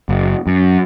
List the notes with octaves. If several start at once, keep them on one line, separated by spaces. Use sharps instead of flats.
F#1
F#2